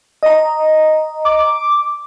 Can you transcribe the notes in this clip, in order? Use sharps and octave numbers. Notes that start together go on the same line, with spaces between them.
D#5 A#5
D6